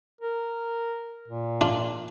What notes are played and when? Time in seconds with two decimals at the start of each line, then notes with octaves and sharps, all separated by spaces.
0.21 A#4
1.28 A#2
1.61 D4 F4